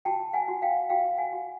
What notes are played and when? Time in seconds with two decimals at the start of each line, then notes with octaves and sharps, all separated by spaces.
0.05 F#4 G5 A5
0.33 F#5 G#5
0.48 F#4
0.62 F5 G5
0.90 F#4 F5 G5
1.18 F#5 G#5
1.33 F#4